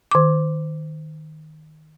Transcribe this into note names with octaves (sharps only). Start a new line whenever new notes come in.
D#3 D6